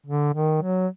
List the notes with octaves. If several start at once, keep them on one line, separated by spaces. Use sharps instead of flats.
D3
D#3
F#3